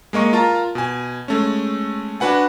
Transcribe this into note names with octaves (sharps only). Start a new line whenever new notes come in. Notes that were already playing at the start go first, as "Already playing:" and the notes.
G#3 A#3 D#5 C#6
F4 A#4 A5 A#5
B2 G#5
G#3 A3 C#4
D4 F#4 B4 F#5 G#5